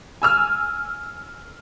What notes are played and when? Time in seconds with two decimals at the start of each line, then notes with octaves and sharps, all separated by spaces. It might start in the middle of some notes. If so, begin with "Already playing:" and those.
0.22 G#5 E6 F6